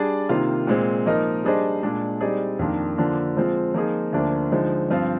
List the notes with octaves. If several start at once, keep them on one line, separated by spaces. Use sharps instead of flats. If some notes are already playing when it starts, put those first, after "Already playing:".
Already playing: G3 D4 G#4 D5
C3 D#3 A#3 F4 C5
A#2 G#3 C4
F3 A#3 D#4 A#4 D#5
G3 D4 G#4 C5 D#5
A#2 G#3 D4
G3 C4 D#4 G#4 D5
F2 D#3 A#3 D4 F4
D3 F3 A#3 D4 F4
F3 G#3 C4 F4
F3 A#3 D#4 G#4
D2 D3 F3 A#3 D4
D3 F3 G#3 D#4
G2 F3 C4 F4